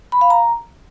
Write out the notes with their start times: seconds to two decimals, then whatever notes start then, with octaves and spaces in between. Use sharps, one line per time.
0.12 B5
0.21 F5
0.30 A#5